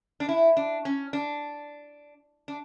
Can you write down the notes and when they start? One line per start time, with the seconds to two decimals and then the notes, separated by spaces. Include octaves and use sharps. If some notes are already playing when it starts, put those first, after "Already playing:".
0.20 D4
0.29 E4
0.57 D4
0.85 C#4
1.13 D4
2.48 D4